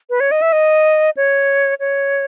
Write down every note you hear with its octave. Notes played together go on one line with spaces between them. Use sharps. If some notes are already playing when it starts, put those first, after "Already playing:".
B4
C#5
D#5
E5
D#5
C#5
C#5